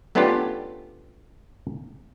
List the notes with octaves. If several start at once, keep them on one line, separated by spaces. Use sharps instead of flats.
A3 B3 C#4 D4 F4 G4